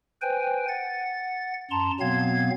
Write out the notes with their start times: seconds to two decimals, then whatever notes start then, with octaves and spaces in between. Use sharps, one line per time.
0.22 B4 C5 G5 G#5
0.68 F#5 A6
1.71 F#2 A5 A#5 C6
2.00 B2 F#3 B3 C4 F5 G#6